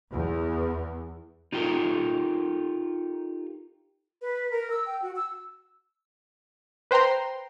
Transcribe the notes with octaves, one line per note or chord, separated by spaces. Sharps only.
E2
D#4 F4 G4 A4 A#4
B4
A#4
E6
G5
F#4
E6
B4 C5 G5 A#5 C6